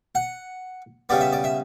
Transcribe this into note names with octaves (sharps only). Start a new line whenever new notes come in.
F#5
C#3 G3 B3 D5
E5
D5
E5